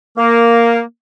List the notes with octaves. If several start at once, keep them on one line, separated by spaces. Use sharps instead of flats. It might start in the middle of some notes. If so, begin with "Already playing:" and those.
A#3